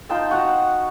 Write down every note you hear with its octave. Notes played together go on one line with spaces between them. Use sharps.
D#4 F4 G5 A5
F#4 F#5 A#5